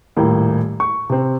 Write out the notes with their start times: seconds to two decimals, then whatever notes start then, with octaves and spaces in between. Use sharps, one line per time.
0.16 D#1 A2 A#3 G4
0.80 C#6
1.10 C3 C4